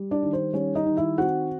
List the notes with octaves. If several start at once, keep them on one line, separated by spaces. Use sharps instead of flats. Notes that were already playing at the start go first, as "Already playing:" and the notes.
Already playing: G3
D4 D5
D#3
C5
G3 C#4 C#5
D#4 D#5
D#3
E4 E5
C4 F#4 F#5